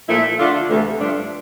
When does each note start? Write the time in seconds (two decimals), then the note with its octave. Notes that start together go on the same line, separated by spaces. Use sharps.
0.08 A#2 F3 A3 E4
0.39 D3 A3 D4 F4
0.70 D2 C3 E3 A3
1.00 G2 F3 A3 D4 F4